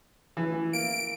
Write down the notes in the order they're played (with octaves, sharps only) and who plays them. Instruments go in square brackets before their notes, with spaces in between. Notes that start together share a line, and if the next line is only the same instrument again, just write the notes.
[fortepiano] E3
[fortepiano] A#3 [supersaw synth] D7